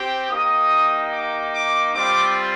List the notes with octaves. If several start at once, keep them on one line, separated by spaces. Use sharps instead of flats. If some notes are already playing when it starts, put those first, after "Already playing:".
Already playing: C4 G4
A#3 D#4 G4 D#6
D6
D6
G3 C4 F4 D6